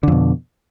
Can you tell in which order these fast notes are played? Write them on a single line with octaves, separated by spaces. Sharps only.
D3 F2 B2